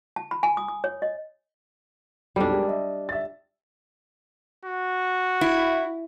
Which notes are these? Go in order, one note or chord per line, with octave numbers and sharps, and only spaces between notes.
A5
B5
G#5
D#6
D#6
C#5
D#5
B1 F2 G3 D4 A4
G#3 G4 A#4
D#5 E5
E5 A6
F#4
E4